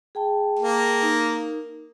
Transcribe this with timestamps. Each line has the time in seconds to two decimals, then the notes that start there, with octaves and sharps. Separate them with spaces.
0.15 G#4 G5 A5
0.59 A#3
1.02 D#4 A#4